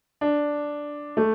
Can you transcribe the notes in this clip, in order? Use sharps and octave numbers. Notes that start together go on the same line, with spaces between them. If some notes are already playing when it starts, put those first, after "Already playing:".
D4
A3